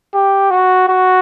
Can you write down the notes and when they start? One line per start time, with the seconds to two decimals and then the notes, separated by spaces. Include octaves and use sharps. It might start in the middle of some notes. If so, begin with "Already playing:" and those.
0.14 G4
0.51 F#4
0.88 F#4